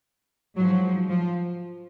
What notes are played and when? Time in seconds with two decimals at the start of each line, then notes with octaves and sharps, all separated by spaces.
0.56 G#2 F3 F#3
1.09 F3